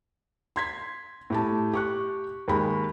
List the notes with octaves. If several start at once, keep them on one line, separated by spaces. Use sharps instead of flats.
C6 G#6 B6
A2 G4 A5
G4 C#6 F#6
D#2 G#3 B5